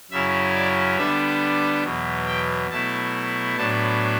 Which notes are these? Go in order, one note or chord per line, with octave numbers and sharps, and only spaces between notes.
F#2 C#3 F#3 C#4 E4 E5
D5
D3 G3 B3 D4 E5
E2 B2 F#3
G5
B2 F#3 A3 E4 A5
A2 F#3 B3 D4 A5